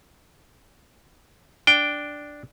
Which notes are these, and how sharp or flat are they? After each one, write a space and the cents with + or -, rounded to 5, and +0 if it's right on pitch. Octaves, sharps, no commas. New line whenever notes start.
D4 +0 G5 +0